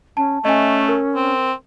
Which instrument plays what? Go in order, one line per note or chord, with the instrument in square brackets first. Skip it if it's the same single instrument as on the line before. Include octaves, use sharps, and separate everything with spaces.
[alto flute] C#4 [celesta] A5
[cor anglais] A3 [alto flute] C#4 [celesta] D#5 E5 G#5
[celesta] A#4
[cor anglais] C4